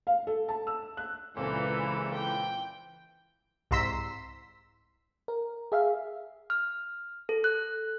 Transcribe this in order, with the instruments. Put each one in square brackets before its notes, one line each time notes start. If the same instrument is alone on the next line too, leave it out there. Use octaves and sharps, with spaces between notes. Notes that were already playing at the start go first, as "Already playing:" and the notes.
[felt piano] F5
A4
A5
E6
F#6
[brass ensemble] C#2 E4 [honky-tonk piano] A#2 C4 [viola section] E3 [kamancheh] A4
[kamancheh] G5
[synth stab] C2 G#2 A#5 C6 E6 B6
[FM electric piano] A#4
G#4 E5 F5
[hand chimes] F6
A4
F#6